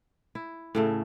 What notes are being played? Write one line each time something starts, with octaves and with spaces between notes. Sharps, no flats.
E4
A2 C#3 A3